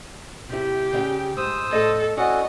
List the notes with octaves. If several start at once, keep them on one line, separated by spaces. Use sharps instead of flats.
C3 E4 G4
C#3 E5 G5
G#2 C5 D#6 E6
A2 A4 D#5
C#4 E4 F#4 A4 D5 D#5 F#5